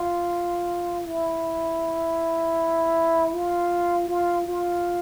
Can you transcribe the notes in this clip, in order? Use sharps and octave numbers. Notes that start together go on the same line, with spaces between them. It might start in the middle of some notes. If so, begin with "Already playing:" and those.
Already playing: F4
E4
F4
F4
F4